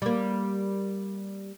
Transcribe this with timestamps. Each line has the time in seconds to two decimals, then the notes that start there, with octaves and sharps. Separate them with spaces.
0.02 G3 A#3